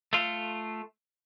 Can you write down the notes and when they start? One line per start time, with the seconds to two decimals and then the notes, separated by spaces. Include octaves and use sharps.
0.13 A3 F4